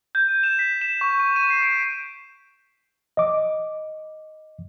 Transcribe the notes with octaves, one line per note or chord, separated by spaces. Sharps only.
G6
D#7
E7
B6
E7
C#6
D#7
D#7
C7
D7
D#5 D6